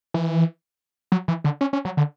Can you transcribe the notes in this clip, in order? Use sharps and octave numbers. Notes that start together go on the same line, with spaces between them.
E3
F#3
E3
D3
C#4
C#4
F#3
D3